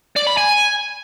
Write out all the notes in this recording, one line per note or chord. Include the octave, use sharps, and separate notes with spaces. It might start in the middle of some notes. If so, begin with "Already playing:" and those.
D5
B5
G#5